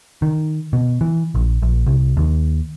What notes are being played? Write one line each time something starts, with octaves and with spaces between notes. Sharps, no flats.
D#3
B2
E3
A#1
A#1
C2
D#2